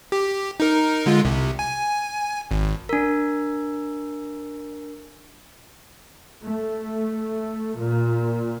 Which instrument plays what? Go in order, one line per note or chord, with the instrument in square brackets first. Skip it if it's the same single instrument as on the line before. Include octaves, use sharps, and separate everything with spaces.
[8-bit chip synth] G4
D#4 A#4
D3 G#3 F4
C2 C3
G#5
G#1
[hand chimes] D4 A#4
[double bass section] A3
A#2